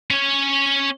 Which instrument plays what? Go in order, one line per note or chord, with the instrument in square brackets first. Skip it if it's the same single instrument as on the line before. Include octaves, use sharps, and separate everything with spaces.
[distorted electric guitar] C#4 C#5